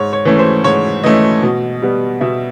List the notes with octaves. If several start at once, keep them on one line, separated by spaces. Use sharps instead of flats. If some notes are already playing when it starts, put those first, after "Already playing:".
Already playing: G#2 C#5
C#5
E3 A3 C#4
C5
G#2 C#5
E3 A3 C#4 D#5
B2
G3 B3
B2 E5